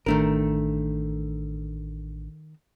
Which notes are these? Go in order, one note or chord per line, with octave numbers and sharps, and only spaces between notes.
A1 D#3 A3 D4 A#4